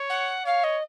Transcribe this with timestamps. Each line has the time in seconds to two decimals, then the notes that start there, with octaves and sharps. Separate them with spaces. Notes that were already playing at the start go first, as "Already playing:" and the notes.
Already playing: C#5
0.09 F#5
0.45 C#5 F5
0.63 D#5